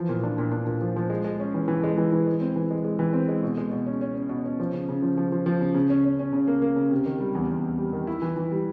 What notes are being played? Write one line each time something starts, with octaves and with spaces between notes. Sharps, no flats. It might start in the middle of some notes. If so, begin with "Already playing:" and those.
Already playing: E3 F3
A#2
D4
A#2
D4
A#2
F3
F3
G#3
G#3
C#4
E3
E3
G#3
E3
E3
G#3
C4
E3
G#3
G#3
E3
C4
G#3
B2
G#3
B2
C#4
C#4
C#4
B2
C#4
F3
C#3
C#3
F3
F3
F3
F3
C#3
C#3
C#4
C#4
C#4
C#3
A#3
A#3
C#3
C3
D#3
G3
E2
E2
E2
G3
D#3
E4
E3
E3
G3